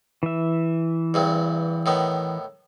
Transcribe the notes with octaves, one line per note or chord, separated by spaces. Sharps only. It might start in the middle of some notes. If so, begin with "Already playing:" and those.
E3 E5
E2 G2 C3
A2 D#3 B3